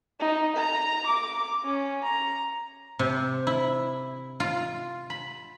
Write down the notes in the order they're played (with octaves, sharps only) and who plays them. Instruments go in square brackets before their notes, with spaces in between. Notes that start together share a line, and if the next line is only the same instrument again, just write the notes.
[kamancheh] D#4
A#5
D6
C#4
A#5
[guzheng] C3
E4
F4
B5